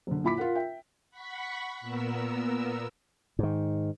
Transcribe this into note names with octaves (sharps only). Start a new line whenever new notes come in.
F#1 D3
A#2 E4 B5 D6 B6
F4 A#4 F#5
E5 G5
F#5 B5 C#6 B6
A#2 B3 A#4 E6
G#2 D#3